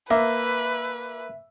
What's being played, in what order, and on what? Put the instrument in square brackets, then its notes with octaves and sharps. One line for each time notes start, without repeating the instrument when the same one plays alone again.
[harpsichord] A#3 [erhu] B4 [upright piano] E5